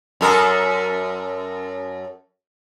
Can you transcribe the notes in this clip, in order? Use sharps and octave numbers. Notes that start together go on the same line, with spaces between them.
F#2 A4 A#4